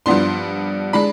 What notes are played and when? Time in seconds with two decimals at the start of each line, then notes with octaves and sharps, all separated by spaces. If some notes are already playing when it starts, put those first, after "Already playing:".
0.06 G2 F3 B3 D4 C6
0.93 G#3 D4 B5